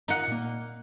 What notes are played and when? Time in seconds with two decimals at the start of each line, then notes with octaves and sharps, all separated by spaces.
0.08 D#4 F4 F#5
0.28 A#2 A#3